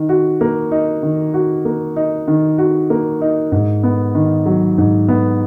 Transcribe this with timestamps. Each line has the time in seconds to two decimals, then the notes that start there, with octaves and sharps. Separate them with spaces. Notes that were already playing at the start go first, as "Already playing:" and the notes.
Already playing: D#3
0.09 F#4
0.41 A#3
0.71 D#4
1.03 D#3
1.34 F#4
1.65 A#3
1.96 D#4
2.28 D#3
2.58 F#4
2.90 A#3
3.21 D#4
3.52 G#2
3.83 B3
4.15 D#3
4.46 F#3
4.78 G#2
5.08 B3